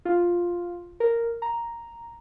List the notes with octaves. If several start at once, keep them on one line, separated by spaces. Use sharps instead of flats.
F4
A#4
A#5